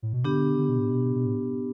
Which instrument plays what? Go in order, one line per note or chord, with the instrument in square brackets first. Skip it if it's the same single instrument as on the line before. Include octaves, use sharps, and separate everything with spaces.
[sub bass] A2
B2
[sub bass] D3 [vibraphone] B3 D4 G4
[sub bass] D3
B2
A2
B2
B2
A2